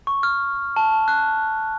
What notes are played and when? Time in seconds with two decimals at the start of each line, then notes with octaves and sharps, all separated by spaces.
0.07 C#6
0.23 F6
0.76 A5
1.08 F#6